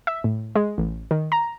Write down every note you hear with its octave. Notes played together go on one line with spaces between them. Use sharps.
E5
A2
G#3
A1
D#3
A#5